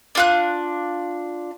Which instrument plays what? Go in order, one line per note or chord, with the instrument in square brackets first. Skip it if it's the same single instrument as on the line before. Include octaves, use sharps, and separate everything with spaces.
[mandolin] D4 F4 F#6